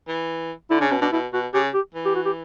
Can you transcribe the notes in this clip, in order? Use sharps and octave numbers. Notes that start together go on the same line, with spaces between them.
E3
D3 E4
C#3 D4
B2 C#4
B2 D4
B2 E4
B2 F#4
C#3 G4
G4
E3
G4
F#4
G4